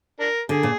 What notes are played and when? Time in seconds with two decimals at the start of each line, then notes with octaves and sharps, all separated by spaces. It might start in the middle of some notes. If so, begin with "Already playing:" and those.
0.20 D4 A#4
0.49 D3 G#4
0.63 A#2